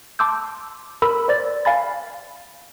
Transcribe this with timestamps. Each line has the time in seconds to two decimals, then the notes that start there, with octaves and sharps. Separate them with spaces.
0.19 A5 C6 D6 E6 G6
1.02 A#4 B5 E6
1.28 C5 D5 A6
1.65 F5 G#5 B5 A6